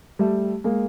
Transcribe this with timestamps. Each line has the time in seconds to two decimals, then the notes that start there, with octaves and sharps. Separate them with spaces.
0.19 G3 A3
0.64 G#3 A#3